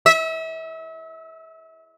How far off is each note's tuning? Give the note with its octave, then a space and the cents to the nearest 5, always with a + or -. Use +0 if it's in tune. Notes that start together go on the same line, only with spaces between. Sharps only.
E5 -35